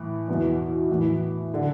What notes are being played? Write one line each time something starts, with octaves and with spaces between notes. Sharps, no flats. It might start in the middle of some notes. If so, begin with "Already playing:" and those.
Already playing: A2 E3
E2 B2
A2 E3
D3